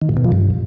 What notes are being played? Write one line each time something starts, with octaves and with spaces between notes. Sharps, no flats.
D#3
A2
B2
F3
G2